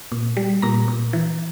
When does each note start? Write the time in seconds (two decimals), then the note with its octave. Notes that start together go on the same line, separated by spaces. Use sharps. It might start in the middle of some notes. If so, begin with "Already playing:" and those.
0.12 A#2
0.37 G3
0.62 A#2 A#5
0.88 A#2
1.13 E3